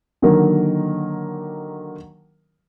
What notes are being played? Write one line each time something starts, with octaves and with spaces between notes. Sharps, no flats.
D3 D#3 F#3 A#3 A#4